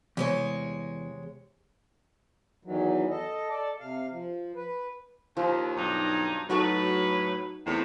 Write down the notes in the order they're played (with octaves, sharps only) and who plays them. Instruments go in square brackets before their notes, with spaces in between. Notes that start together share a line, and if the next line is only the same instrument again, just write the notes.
[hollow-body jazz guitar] E2 [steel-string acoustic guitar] C3 G#3 C#5
[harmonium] E2 D#3 E3 F#3
A4 D#5
A4 D5
C3 F5
F3
B4
[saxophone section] D#2 [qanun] F3
[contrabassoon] B1 [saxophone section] G2 D#4
[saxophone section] A2 B4 [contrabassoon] F#3 [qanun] D#4 F#4 A4
[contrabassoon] E2 [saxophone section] A2 C3